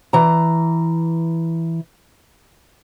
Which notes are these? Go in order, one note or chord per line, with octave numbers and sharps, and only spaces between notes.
E3 A#5